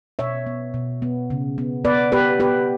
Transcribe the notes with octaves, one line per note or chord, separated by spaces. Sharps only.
B2 C#5 E5
B3
B2
B3
C#3
B3
B3 B4 D5
B3 G4 B4
B3 G4 B4